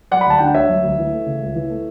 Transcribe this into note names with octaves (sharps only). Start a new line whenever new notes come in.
F#3 D5 F#5
B5
D2 A5
D3 G5
F#5
D2 C#5 E5
F#3
D2
E3
A3
C#3
C#2
E3
A3